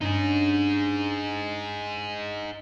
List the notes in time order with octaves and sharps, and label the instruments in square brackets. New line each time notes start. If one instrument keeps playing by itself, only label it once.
[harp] G2 C#4 [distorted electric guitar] D#4 G#4